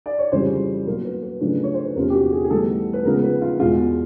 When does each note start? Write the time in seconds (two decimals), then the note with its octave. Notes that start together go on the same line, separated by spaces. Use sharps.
0.06 D5
0.19 C#5
0.32 F2 C#3 E3 G3 C5
0.87 B2 F#3 A#3 A#4
1.04 B4
1.23 B4
1.41 F#2 C#3 F3 A3 D4 B4
1.63 C#5
1.74 C5
1.85 B4
1.96 E2 C3 F3 A#3 C#4 A#4
2.10 G4
2.14 F#4
2.32 G#4
2.44 G#4
2.50 A2 E3 G3 B3 A4
2.93 B4
3.05 C#3 F3 G#3 B3 A#4
3.23 B4
3.42 F4
3.60 E2 B2 G#3 F4